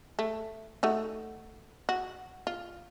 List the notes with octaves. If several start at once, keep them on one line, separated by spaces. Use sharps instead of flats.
A3
A3 D#4 F#4
F#4
F4